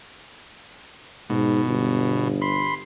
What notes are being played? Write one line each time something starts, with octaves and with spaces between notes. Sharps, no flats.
G#2 B2
G1
B5 C6